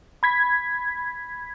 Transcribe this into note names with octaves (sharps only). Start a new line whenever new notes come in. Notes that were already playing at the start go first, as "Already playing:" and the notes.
B5 G#6 B6